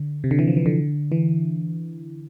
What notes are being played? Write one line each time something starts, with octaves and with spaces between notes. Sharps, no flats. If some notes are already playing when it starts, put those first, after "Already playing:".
Already playing: D3
C3
D3
E3
F3
E3
D3
E3